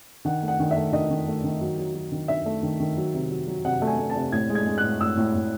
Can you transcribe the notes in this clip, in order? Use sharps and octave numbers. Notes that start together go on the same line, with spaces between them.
D#3 F#5
A3
F#5
D#3
E5
A3
D#3 D#5
D#3
A3
D#3
F#3
F#3
F#3
D#3
D#3 E5
A3
D#3
D#3
F#3
C3
F#3
F#3
C3 F#5
A3
G#5
A3
A5
C3
A2 G#6
G#3
G#6
G#3
F#6
A2
A2 E6
A2
A2